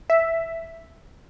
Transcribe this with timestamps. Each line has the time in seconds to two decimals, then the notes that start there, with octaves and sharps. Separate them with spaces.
0.10 E5